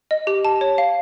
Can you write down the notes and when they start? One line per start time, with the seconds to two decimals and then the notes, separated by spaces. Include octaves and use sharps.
0.11 D#5
0.27 G4
0.45 A5
0.61 C#5
0.78 F5